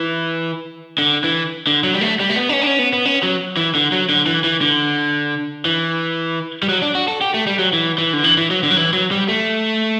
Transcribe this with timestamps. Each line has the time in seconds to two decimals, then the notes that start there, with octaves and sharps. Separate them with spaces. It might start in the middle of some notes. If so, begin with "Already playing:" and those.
Already playing: E3
0.98 D3
1.24 E3
1.67 D3
1.84 F#3
1.94 G3
2.01 A3
2.19 G3
2.30 A3
2.36 B3
2.49 D4
2.53 C#4
2.62 D4
2.66 C#4
2.79 B3
2.93 B3
3.05 C#4
3.23 F#3
3.57 E3
3.75 D3
3.92 F#3
4.09 D3
4.26 E3
4.44 E3
4.61 D3
5.65 E3
6.63 G3
6.69 F#3
6.82 D4
6.95 F#4
7.08 A4
7.21 G4
7.34 A3
7.47 G3
7.59 F#3
7.73 E3
7.98 E3
8.13 D3
8.24 E3
8.38 E3
8.50 F#3
8.63 D3
8.71 F#3
8.77 E3
8.93 F#3
9.11 G3
9.28 A3